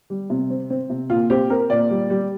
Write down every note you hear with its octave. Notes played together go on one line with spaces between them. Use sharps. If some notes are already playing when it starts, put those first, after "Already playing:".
G3
C3
C4
C4
C3
A#2 F4
C4 G4
C4 A#4
A#2 D5
G3
G3